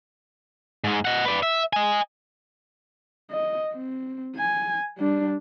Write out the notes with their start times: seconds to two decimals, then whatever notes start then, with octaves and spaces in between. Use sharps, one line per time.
0.84 G#2 G#3
1.05 D#5 F#5
1.25 B4 D5
1.43 E5
1.73 D#5 G#5
3.31 D#5
3.74 C4
4.36 G#5
4.98 G3 D4